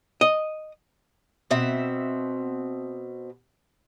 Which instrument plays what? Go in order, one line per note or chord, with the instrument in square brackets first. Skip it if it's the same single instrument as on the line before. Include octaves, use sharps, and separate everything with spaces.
[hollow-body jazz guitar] D#5
[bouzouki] B2 C4 E5